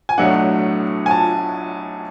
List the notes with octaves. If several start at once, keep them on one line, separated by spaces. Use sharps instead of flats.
G#5
B1 A2 F#3 A3 D4 F#5
G#5
A5